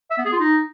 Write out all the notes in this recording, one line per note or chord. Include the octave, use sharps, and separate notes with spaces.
E5
B3
G#4
F4
D#4